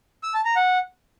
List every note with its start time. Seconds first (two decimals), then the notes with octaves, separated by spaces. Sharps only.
0.23 E6
0.34 A5
0.45 A#5
0.56 F#5